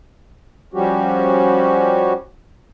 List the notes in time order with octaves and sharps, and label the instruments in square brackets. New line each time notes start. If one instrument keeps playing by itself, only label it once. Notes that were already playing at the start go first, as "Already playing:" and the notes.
[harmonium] F3 G3 C#4 F#4 G4